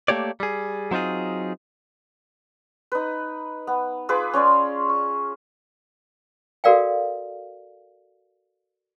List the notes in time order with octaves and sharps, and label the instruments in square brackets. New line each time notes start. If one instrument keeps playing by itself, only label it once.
[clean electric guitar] A3 A#3 G4 C#5 D5
G3 G#4
F#3 C4 D#4 F4 G#4
[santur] D#4 B4
B3
F4 G#4 B4 D6
C#4 C#5 D5 C6
C#6
[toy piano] F#4 A4 A#4 D5 F5 G5